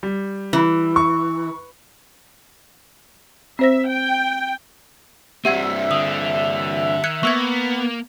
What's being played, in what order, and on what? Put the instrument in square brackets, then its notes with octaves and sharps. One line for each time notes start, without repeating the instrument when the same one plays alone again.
[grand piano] G3
[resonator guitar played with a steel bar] E3
[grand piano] C#6
[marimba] C4 C5 A#6 [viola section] E5
[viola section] G5
[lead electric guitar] G2 C4 [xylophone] G4 F#5 G#6 [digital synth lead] E5
[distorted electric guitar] D3 [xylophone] D#6
[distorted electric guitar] D#3 [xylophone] F#6 G#6 C#7
[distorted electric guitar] A#3 [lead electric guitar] B3 [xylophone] C#6 E6 G#6